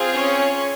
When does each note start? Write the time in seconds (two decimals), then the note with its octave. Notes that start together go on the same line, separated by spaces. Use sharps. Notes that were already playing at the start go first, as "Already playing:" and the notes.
Already playing: C4 F4 G#4
0.13 C#4 C#5